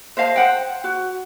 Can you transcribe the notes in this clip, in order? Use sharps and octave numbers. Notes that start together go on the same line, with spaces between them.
C5 D#5 F5 A5
C5 F#5 G5
F#4